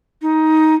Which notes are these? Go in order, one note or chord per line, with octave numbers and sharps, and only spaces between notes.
D#4